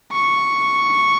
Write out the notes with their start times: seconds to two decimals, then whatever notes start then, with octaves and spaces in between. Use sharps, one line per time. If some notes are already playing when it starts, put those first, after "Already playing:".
0.12 C#6